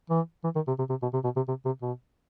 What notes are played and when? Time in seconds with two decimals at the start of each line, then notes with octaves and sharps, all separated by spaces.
0.10 E3
0.44 E3
0.55 D#3
0.67 C3
0.78 C3
0.89 C3
1.02 B2
1.13 C3
1.24 B2
1.36 C3
1.48 C3
1.65 C3
1.82 B2